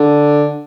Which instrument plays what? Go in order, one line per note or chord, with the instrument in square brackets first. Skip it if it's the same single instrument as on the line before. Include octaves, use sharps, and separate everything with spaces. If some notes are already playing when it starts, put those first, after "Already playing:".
Already playing: [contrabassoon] D3